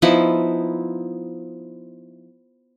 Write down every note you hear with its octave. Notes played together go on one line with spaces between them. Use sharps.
F3 B3 D#4 E4